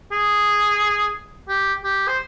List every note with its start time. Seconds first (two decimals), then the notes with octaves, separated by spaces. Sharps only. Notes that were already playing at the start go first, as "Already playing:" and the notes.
0.12 G#4
1.49 G4
1.84 G4
2.08 C5